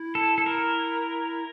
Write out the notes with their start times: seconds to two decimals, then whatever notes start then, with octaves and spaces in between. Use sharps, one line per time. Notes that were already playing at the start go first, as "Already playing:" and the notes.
Already playing: E4
0.15 A4
0.38 A4
0.46 A#4